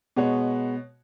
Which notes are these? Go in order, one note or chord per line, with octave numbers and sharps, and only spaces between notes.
B2 G#3 B3 F#4 C#5